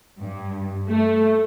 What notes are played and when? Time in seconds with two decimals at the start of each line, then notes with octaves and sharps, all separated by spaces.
0.20 G2
0.90 A3